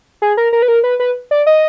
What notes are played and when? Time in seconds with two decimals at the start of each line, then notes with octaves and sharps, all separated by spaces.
0.22 G#4
0.37 A#4
0.53 A#4
0.62 B4
0.68 A#4
0.84 B4
1.00 B4
1.31 D5
1.47 D#5